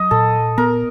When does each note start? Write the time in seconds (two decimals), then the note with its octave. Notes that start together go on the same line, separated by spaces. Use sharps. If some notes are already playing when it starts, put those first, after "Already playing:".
Already playing: F#3 D#5
0.11 A#2 A4
0.58 B3 A#4